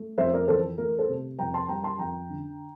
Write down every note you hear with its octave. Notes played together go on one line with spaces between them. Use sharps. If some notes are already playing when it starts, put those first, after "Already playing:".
Already playing: A3
F2 C5 E5
A#4 D5
E3 A4 C5
A3 A#4
A4 C5
C3
F2 G5 A#5
A5 C6
G3 G5 A#5
A5 C6
F2 G5 A#5
D3